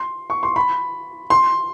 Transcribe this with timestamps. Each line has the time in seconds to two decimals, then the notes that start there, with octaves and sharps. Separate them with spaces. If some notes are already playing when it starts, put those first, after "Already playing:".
Already playing: C6
0.30 C#6
0.43 C6
0.56 B5
1.30 C6